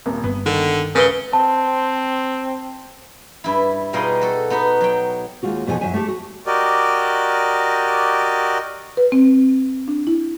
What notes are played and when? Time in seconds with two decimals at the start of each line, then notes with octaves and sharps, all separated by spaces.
0.06 D#1 G#1 A#3
0.24 G1 B3
0.46 D3 D#3
0.95 C#2 C#3 A#4 B4 G7
1.33 C4 A5
3.44 G2 E4
3.93 B2 G3 D#4 F4 G#4 D#5
4.21 F#4 A4
4.50 B3 D#4 F#4 B4
4.81 F#3 G5
5.43 D#2 G#3 F4 F#4
5.67 E2 B2 F3 G#4 A4 G#5
5.81 F#2 F3 F#3 E5 G#5
5.94 A3 G4 A4
6.08 F#4
6.46 F#4 G4 A#4 D5 D#5
8.97 B4
9.12 C4
9.88 D4
10.07 E4